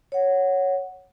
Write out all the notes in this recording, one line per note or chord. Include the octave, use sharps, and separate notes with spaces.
C#5 F#5